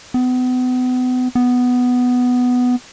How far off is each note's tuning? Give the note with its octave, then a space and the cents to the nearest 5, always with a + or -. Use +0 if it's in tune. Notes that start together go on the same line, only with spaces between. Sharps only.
B3 +35
B3 +5